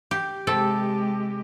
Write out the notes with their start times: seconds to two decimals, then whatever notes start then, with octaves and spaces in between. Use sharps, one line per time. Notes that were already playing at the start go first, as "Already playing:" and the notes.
0.11 G4
0.47 C3 G#3 G4 A4